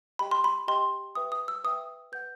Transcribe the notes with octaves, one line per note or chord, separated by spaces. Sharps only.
G4 D#5 G5 B5
C6
B5
G4 D#5 G5 C6
B4 E5 G5 D#6
D#6
E6
B4 E5 G5 D#6
B4 F#5 G6